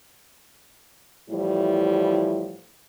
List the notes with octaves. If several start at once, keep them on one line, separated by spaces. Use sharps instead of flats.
A2 E3 F3 G3 E4